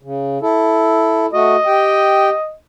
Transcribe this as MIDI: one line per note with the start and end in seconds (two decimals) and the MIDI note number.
0.03 0.38 49
0.41 1.26 64
0.41 1.26 69
1.33 1.56 57
1.33 1.56 66
1.33 2.53 75
1.66 2.30 67
1.66 2.30 79